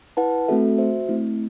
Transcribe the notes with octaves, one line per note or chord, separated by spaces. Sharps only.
E4 B4 F#5 A5
A3 C4 F#4 A4 E5
F#4 C5 E5
A3 C4 E4